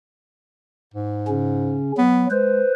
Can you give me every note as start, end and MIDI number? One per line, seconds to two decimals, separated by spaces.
0.94 1.81 44
1.28 1.92 49
1.28 1.92 61
1.98 2.26 54
1.98 2.30 59
2.31 2.62 56
2.31 2.73 71
2.31 2.73 72